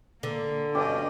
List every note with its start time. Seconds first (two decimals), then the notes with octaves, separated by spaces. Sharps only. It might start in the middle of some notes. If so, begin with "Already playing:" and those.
0.23 D3 A#3
0.75 G2 B2 C#4 D4 G4 D#5